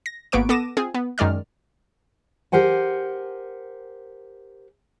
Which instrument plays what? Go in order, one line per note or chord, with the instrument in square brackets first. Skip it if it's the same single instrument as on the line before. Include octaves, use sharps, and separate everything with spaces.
[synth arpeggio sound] A#6
G#1 A#3 B3 B4 C#6 D7
B3 A4 D6 A#6 D#7 E7
C4 F4 G#4
B3
F#2 D#3 G#3 D5 F6
[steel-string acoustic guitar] G4 A#4 C5 F#5 G#5